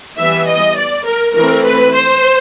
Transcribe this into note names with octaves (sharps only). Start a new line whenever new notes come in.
E3 G3 B3 E5
D#5
D5
A#4
E3 A3 C4 A#4
B4
C5